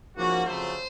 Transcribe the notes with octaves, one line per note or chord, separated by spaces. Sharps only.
G#2 F3 A#3 C#4 F#4
F2 C#3 F#3 A3 C5